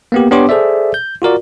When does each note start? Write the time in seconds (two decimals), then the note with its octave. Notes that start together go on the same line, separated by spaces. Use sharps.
0.12 A#3 B3 G4
0.31 B3 D4 G4 C#5 C6 D6
0.49 G#4 A4 C5 D5 E5
0.94 G6
1.22 F4 F#4 A#4 D5